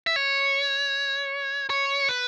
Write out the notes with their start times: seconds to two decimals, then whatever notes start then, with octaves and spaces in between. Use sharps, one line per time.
0.07 E5
0.16 C#5
1.70 C#5
2.09 B4